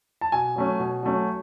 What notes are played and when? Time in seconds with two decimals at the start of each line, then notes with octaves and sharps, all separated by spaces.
0.21 A5
0.32 B2 G#5
0.56 F#3 A3 C#4
0.79 B2
1.03 F#3 A3 C#4